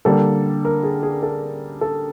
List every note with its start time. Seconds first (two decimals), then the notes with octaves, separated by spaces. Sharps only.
0.05 D3 G3 A#3 A4
0.65 A#4
0.83 G#4
1.03 G#4
1.23 A4
1.81 A4